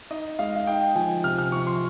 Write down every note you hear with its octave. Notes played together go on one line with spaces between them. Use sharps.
D#4 D#5
G#3 F5
F5
D#4 G5
F3 G#5
C3 F6
F6
F3 C#6
C6